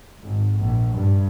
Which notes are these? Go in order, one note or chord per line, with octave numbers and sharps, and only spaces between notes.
G#1
A#1
G2